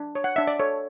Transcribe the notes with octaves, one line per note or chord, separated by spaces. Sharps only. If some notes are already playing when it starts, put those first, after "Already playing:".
Already playing: D4
C#5
F#5
D4 E5
D5
A4 C#5